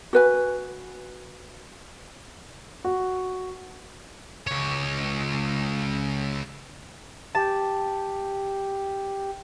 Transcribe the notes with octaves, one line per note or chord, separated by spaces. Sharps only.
F#4 B4 G#5
F#4
C#2 C#5
G4 A5